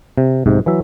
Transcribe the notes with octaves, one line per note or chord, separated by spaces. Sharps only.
C3
B1 G#2 C3
E3 F#3 E5